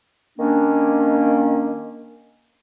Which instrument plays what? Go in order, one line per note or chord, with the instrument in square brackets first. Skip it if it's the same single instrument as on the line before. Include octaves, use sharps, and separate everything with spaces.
[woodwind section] D#3 A#3 C#4 D4